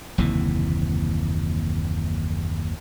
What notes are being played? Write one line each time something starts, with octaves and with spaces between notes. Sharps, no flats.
F#1 D#2 C3 E3